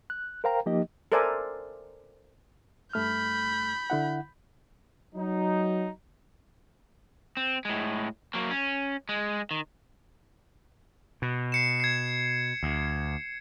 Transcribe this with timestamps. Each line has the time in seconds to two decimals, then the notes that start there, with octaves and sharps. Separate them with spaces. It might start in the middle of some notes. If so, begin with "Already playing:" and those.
0.10 F#6
0.44 A#4 C5 F5 G5 A#5
0.66 F3 A#3 D#4 G4 D#5
1.12 A4 A#4 C5 D5 E5 G#5
2.93 G2 A3 B5 F6 G6
3.90 D3 E4 F#5
5.15 F#3 D#4
7.37 C4
7.65 A2 G#3
8.34 F#3 A#3
8.50 C#4
9.09 G#3
9.51 D#3
11.22 B2
11.52 C7 C#7 E7
11.80 G#6 C7
12.63 D2